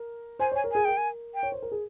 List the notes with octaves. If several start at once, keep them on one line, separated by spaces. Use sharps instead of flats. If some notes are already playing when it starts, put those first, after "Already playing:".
Already playing: A#4
C5 G#5
C#5 G#5
A#4
G#4 G#5
A#4 G5
G#5
G5
C#5
C5
A#4
G#4